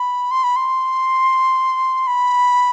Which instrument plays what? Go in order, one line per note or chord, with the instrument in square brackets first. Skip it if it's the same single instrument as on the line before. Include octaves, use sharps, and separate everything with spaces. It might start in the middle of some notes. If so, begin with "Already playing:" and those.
Already playing: [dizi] B5
C6
B5
C6
B5